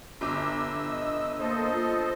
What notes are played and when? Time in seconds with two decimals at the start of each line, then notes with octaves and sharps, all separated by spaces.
0.21 G1 D6 E6
0.90 D#5
1.40 A#3 A4 C5 D#5
1.72 F4